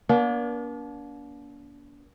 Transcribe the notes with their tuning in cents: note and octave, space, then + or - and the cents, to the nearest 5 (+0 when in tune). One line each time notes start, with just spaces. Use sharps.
A#3 +40 D4 -35